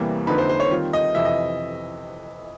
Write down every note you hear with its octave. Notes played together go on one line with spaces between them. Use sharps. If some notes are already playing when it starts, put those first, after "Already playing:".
Already playing: E2 C3 E3 G3 A#3
F2 D3 F3 A#3 D#4 B4
C5
C5
C#5
D#3 G3 C4 F4
D#5
F2 C3 E3 E5
D#5